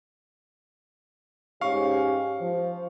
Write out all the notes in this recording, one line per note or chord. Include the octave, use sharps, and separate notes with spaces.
G#2 C#4 G4 F5 C#6
F3